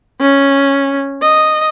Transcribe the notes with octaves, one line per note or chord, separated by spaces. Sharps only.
C#4
D#5